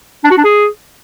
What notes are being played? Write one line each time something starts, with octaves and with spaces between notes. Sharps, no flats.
D4
F#4
D4
G#4